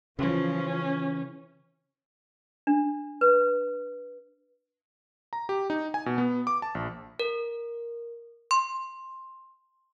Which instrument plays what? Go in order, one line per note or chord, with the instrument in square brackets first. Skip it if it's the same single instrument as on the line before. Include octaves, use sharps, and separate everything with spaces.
[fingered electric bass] C#3 E3 [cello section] F3 [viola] C#4
[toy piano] D4
B4
[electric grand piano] A#5
G4
D#4
G#5
B2
B3
D6
A5
A#1
[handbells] A#4
C6